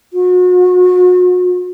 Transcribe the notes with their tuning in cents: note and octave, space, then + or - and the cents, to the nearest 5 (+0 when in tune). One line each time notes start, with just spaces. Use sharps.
F#4 -40